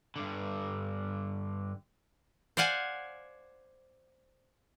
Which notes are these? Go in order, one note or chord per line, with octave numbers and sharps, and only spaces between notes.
G2 D3
C5 D5 F5 F#5 G#5